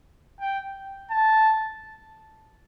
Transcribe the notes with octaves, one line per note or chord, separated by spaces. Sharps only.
G5
A5